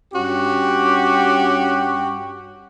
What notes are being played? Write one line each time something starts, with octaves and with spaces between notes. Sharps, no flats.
G2 C#4 F#4 G4